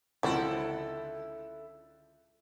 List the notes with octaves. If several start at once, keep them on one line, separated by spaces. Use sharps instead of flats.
C#2 D3 F3 F#3 C4 E4 A4